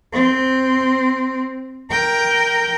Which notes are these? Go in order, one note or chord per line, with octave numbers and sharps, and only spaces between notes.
C4
A#4 G5